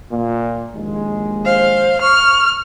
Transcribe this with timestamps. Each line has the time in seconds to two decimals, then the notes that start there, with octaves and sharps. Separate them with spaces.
0.11 A#2
0.73 A#1 D#2 G#3
1.45 C5 F5
2.02 C#6 F6